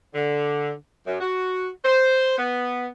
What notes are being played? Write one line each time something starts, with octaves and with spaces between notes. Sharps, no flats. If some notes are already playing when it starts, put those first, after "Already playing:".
D3
F#2
F#4
C5
B3